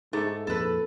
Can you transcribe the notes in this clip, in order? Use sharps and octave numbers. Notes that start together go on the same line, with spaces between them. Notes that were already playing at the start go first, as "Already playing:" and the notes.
G#2 A3 D#4 G#4 A#5
F2 A#2 A4 B4